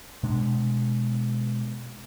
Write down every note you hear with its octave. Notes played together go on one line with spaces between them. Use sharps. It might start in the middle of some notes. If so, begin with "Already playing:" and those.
B2 G#3 D4